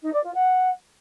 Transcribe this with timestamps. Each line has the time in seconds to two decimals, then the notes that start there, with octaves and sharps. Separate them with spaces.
0.02 D#4
0.13 D5
0.24 F4
0.34 F#5